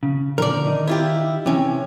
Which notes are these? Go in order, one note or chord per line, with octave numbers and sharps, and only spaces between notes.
C#3
A#2 D3 F3 A#4 D5
D#3 D#4
E4 F4 G4
C3 E3 C#4